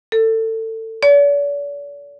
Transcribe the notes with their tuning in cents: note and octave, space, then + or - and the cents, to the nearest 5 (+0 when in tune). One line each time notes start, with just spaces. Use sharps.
A4 +25
D5 -45